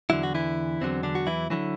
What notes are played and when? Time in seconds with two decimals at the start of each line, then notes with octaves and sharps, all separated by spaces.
0.10 E2 D3 F#3 E4
0.23 F#4
0.35 E3 E4
0.81 E2 D3 F#3 C4
1.03 D3 D4
1.15 F#4
1.27 E3 E4
1.50 D3 E3 F#3 E4